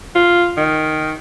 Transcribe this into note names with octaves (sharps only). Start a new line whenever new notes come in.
F4
D#3